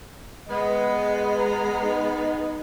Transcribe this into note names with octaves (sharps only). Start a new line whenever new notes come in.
G#3 B3 D#5
A#5
D#4